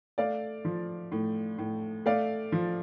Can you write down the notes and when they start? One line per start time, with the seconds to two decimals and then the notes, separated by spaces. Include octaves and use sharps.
0.18 A3 D5 F5
0.65 F3
1.12 A2
1.58 A2
2.06 A3 D5 F5
2.52 F3